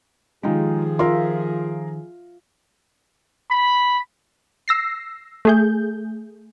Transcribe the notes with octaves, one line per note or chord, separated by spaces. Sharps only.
D#3 F3 G#3 D#4 F4 G4 G#4
F4 A#4 E5 C6
B5
E6 A#6 C7
A3 G#4 G6